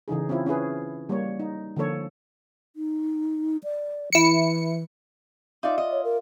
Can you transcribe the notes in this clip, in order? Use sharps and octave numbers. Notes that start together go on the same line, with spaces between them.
C#3 E3 D#4 G#4
C4 C#4 E4 F4
C#4 E4 G#4 B4
G3 A#3 C#5
D#4
D3 F3 A#3 A4 C#5
D#4
D5
E3 E4 C#7
D#4 F4 D5 E5
D#5
C#5
A#4